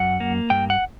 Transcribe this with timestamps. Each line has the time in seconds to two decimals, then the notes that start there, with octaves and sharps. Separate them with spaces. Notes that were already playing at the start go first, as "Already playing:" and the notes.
Already playing: F#2 F#5
0.20 A#3
0.50 G2 G5
0.70 F#5